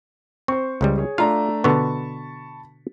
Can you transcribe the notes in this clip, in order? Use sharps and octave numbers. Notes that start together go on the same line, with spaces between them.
C4 C5 C#6
C#2 C#3 G3
G#4 C#5
A3 D4 F4 F5 A#5
B2 D3 B3 A5 B5 C#6